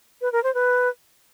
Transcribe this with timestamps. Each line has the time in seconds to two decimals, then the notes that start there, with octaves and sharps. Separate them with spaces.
0.21 B4
0.32 A#4
0.43 C5
0.54 B4